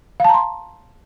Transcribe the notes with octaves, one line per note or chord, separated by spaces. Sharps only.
F5 A5 A#5 C6